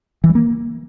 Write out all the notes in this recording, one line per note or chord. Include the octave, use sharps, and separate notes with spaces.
E3
G3
A#3